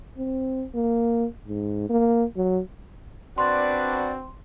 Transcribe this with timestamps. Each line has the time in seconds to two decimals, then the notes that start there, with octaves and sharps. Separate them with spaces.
0.17 C4
0.74 A#3
1.48 G#2
1.90 A#3
2.36 F#3
3.38 C4 D4 F#4 B4 D5 C6